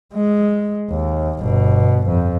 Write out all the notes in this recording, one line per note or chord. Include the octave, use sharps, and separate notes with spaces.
G#3
D#2
G1 B2
F2